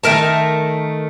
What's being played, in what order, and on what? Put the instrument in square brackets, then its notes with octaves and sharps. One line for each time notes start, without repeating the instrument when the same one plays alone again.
[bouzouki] D#3 A3 A#4 A5